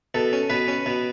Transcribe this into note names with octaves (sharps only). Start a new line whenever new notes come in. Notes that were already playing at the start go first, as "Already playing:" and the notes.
B2 A4
C#4
B2 B4
C#4
B2